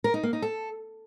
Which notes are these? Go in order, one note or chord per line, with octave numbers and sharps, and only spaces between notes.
A#4
D#4
A#3
D#4
A4